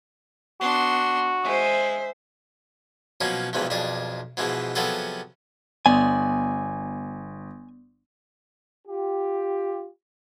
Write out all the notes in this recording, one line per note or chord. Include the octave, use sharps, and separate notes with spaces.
B3 D4 F#4 C6
G#3 C5 E5
B2 F3 F#3 A#3 C#4
B1 E2 G#2 C3 E3 F3
B1 F2 D4 G#4
G#2 B2 E3 F3 G#3
C3 F3 F#3 B3 G#4 A4
G1 B3 D5 G#5 C6
F4 G4